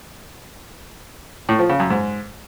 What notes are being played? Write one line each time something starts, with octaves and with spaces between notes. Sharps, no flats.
A2
F3
C#3
F#2
G#2